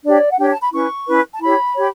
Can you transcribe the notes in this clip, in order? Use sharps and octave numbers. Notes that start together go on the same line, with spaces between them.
D4 G4 C#5 D5
F#5
D4 G4 C#5 G5
A5
B5
C#4 E4 B4 C#6
C#4 E4 B4
A5
E4 G4 C#5 B5
G4 C#5